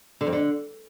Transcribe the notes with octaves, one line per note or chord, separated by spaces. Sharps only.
D3
F2
D3